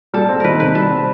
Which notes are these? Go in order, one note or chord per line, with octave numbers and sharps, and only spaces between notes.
G3 A4
C4
D#3 A#4 B4
C3 B4
G3 A4
C4